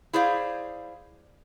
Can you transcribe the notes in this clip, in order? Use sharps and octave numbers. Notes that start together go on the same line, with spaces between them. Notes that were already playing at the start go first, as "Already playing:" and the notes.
E4 G#4 C5 D5 F5